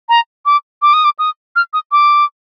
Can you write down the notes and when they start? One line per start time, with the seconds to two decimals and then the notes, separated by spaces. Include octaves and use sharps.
0.09 A#5
0.45 D6
0.82 D6
0.93 D#6
1.05 D6
1.19 D#6
1.56 F6
1.73 D#6
1.92 D6